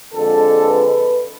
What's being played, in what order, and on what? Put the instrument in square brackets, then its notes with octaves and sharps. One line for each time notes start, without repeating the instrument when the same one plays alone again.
[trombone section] F2 D3 G#3 A4
B4